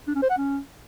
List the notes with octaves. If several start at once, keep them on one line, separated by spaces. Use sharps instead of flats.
D4
C#4
C5
F#5
C#4